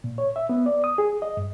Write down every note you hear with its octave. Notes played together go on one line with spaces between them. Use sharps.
A#2
C#5
E5
B3
D5
D#6
G#4
D#5
G2